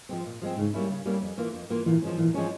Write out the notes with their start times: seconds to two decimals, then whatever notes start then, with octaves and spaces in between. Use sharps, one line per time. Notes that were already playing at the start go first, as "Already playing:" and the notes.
0.09 F3 G#3 C4
0.26 A#2
0.41 F3 G#3 C4
0.58 G#2 C#3
0.74 G3 A#3 C#4 E4
0.90 C#3
1.05 G3 A#3 C#4 E4
1.21 F2
1.38 E3 A#3 F4
1.54 F2
1.70 E3 A#3 F4
1.86 A#2 E3
2.02 F3 G#3 C#4
2.18 A#2 E3
2.34 F3 G#3 C#4